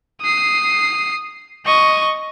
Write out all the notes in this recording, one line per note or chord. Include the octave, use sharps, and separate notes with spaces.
D#6 C7
D#5 C#6